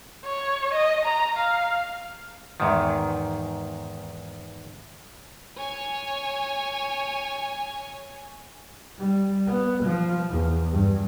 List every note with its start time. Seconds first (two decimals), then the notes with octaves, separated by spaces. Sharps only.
0.24 C#5
0.73 D#5
1.05 A#5
1.37 F5
2.60 E2 G#2 D#3
5.57 C#5 G#5
8.98 G3
9.47 B3
9.84 F3
10.29 E2
10.71 G2